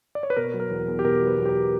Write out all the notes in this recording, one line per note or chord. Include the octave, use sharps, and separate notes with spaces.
D5
C#5
B4
B2 A#4
F#3
A#4
E2
E2
G4
B2 A#4
F#3
B4
E2
G4
A#4